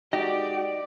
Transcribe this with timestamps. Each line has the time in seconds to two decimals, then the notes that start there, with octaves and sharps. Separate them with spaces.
0.13 G#3 D#4 F#4 G4 D5 D#5